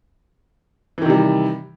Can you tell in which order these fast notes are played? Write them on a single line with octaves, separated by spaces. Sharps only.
E3 D#3 C3 G3